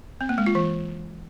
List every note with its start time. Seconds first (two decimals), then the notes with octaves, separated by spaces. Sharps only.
0.21 C4
0.29 A#3
0.38 G#3
0.46 F4
0.55 E3